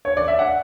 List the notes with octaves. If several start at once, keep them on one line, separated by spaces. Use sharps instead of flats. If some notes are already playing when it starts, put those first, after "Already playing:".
C#5
D5
E5
F#5